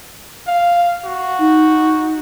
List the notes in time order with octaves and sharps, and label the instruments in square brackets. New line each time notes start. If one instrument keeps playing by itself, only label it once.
[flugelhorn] F5
F#4
[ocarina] D#4